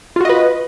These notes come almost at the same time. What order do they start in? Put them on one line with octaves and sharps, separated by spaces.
F4 F#4 D#5 B4